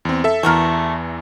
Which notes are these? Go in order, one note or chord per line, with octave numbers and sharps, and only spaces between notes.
E2 C4
A4 E5
E2 E3 A3 F#4 A#4